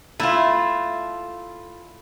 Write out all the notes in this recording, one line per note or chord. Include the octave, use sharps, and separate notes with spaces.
A3 E4 F4